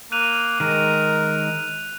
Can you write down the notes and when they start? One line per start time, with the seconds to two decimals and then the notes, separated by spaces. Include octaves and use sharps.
0.12 A#3 F#6 D#7 F7
0.60 D#3 G#3 A#4